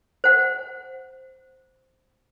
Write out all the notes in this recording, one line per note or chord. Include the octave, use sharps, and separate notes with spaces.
C5 F#5